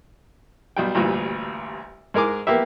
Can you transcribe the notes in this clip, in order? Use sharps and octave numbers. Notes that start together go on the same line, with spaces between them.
B1 G3 G5
A1 D2 G2 A#2
G#2 G#3 A#4 G#5 D6
A#3 B3 G4 E5